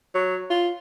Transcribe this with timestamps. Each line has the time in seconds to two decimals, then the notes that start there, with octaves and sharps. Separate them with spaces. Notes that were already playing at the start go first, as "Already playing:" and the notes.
0.15 F#3
0.50 F4